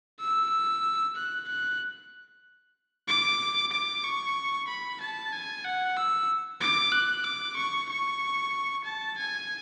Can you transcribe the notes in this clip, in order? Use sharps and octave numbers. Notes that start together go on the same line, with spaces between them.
E6
F#6
F#6
D6
D6
C#6
B5
A5
G#5
F#5
E6
D6
F#6
D6
C#6
C#6
A5
G#5